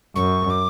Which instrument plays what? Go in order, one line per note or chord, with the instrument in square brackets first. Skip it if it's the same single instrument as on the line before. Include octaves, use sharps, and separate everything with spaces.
[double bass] F#2 [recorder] C#6
[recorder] D6